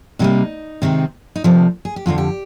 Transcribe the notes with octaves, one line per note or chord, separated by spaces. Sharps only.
C3 G3 A#3 D#4
C3 D#3 G#3 C4
D#4
D2 C3 F3 D4
G#4
G4
F2 D3 F3 F4
G4